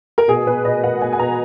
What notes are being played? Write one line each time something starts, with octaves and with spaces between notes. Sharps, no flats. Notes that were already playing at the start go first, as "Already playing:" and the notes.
A#4
B2 G#4
B2 B4
B2 D#5
B2 F#5
B2 G#5
G#5
B2 A#5